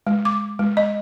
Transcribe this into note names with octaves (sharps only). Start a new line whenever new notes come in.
G#3
D6
G#3
D#5